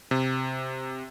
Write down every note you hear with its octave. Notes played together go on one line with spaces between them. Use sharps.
C3